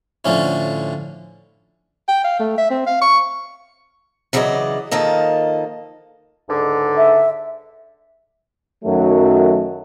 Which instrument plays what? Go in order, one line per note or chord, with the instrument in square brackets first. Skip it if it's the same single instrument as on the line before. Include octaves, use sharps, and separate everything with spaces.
[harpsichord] A2 D3 F3 C#4 E4
[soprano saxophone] G5
F5
A3
E5
C4
F5
C#6
[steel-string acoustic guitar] C#3 E3 F#3 B4 D5 D#5
D#3 F3 A#3 A4 D#5
[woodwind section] C#2 G#2 D3
[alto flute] E5
[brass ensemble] F#2 D#3 F#3 A3